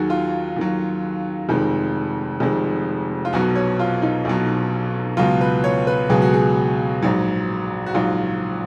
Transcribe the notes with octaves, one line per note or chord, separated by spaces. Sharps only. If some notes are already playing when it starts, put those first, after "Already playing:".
Already playing: D#2 D#3 F#3 F#4 G#4
F4
D#2 D#3 F#3
F1 F2 D#3 G#3
F1 F2 D#3 G#3
F4
B1 B2 F#3 F#4
C#5
F4
D#4
B1 B2 F#3
C#2 B2 F#3 F4
B4
C#5
B4
C#2 B2 F#3 G#4
F#4
G#4
A#1 G#2 F#3
F#4
A#1 G#2 F#3 F4